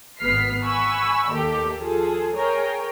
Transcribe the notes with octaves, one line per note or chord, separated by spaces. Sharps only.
G#1 B3 F6 B6 C7
F#5 G#5 B5 C#6 E6
D#2 G4 A4 G5
F3 G#4 A4
G#4 A#4 C#5 G5